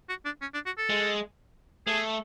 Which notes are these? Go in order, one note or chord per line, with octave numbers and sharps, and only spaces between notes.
F#4
D4
C#4
D4
F#4
A4
G#3
A3 G#4